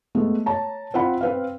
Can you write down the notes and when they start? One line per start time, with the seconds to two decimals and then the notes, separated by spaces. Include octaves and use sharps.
0.15 G#3 A3 B3
0.46 C#5 A5 A#5
0.94 C4 F4 F#5 B5
1.21 C4 B4 F5